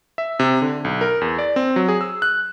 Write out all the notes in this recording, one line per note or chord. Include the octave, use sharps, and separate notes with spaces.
E5
C3
D3
B1
A#4
E2
D5
C4
F#3
G#4
E6
F#6